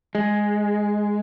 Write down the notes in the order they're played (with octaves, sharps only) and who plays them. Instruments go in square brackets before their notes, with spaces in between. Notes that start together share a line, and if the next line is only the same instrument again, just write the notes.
[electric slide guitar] G#3